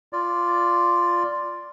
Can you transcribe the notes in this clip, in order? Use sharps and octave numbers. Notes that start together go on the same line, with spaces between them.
F4 D5